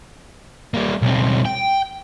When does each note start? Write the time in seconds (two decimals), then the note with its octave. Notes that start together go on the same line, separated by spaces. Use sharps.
0.74 G3 A#3
1.02 B1 C4
1.45 G5